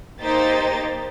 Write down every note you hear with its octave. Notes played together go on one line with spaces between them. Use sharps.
A#3 D#4 G4 C5 A#5 A6